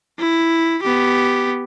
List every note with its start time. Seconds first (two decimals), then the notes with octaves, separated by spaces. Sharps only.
0.19 E4
0.82 B3 G4